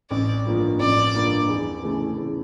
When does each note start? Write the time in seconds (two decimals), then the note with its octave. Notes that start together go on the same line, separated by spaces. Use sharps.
0.10 A1 D5
0.45 G2 F3 A#3
0.80 A1 D5
1.14 G2 F3 A#3
1.48 E2
1.83 C#3 E3 A3
2.17 E2